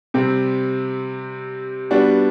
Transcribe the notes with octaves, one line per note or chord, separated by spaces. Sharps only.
C3 G3 C4
G3 B3 D4 F#4